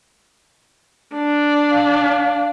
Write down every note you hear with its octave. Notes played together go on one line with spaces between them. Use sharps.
D4
F5